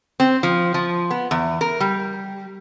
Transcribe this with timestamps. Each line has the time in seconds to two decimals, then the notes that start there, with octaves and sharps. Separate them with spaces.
0.20 C4
0.43 F3
0.74 F3
1.11 B3
1.31 E2
1.61 A#4
1.80 G3